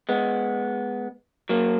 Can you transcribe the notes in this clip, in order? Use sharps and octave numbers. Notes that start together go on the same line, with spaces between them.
G#3 B3
F#3 A#3